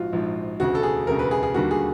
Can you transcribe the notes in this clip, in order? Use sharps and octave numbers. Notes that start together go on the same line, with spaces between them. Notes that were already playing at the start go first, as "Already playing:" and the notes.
Already playing: A#1 G#2 F3 F4 F#4
A#1 G#2 F3
E1 D2 C#3 F#4
A4
G#4
E1 D2 C#3 A#4
B4
G#4
G#4
D#2 D3 G3 A#3 F#4
G#4